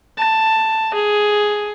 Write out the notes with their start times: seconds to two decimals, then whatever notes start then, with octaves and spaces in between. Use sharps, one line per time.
0.18 A5
0.94 G#4